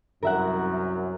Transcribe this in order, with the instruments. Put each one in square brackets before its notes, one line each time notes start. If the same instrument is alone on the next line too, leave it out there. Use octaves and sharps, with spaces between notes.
[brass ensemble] C2 F#2 [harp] A#4 E5 F#5